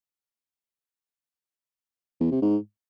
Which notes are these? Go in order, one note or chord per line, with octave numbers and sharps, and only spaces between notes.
E2
C3
G#2